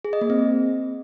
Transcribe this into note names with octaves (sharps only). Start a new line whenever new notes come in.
G#4
D#5
A#3
C4